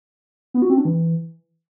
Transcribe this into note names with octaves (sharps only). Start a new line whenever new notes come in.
B3
F#4
C4
D4
E3